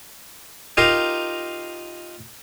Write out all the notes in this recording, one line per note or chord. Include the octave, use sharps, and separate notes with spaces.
D#4 F4 G4 A#4 F5